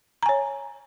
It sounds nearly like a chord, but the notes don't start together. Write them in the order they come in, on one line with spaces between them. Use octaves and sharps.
A#5 G#5 C#5